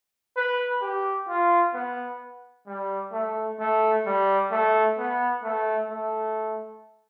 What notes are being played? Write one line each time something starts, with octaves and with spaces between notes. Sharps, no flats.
B4
G4
F4
B3
G3
A3
A3
G3
A3
B3
A3
A3